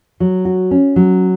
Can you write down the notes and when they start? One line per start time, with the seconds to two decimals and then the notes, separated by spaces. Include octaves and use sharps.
0.20 F#3
0.45 F#4
0.71 C#4
0.96 F#3